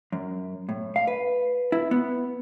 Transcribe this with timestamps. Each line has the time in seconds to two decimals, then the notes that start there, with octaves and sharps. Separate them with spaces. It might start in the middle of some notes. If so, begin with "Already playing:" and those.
0.12 F#2
0.69 A2
0.96 F5
1.07 B4
1.72 E4
1.91 B3